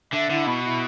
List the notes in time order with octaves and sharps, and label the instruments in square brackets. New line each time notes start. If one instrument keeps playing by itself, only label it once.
[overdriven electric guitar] D3 [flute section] E5
[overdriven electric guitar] D3 [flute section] E4
[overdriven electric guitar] B2 [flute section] B5
[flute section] E4